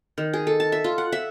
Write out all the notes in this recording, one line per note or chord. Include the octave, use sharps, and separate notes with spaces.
D#3
G#4
A4
A5
E5
F4
F#5
E5